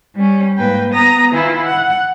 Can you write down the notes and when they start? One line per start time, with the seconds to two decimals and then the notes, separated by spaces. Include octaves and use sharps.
0.16 G3 C#4
0.58 G#2 A#3 B4 G5
0.93 B3 A#5 D#6 A#6
1.33 D#3 E3 E4 F4
1.65 F#5